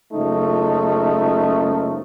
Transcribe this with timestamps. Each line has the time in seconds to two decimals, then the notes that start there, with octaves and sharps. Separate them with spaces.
0.13 F#1 C#2 F3 A3 D#4